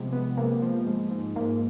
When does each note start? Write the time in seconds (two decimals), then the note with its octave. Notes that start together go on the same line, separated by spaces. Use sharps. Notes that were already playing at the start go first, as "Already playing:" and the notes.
Already playing: C3 F3 G#3 B3
0.12 B3
0.37 C3 A#3
0.62 F3
0.87 G#2
1.11 G#2
1.36 G#2 A#3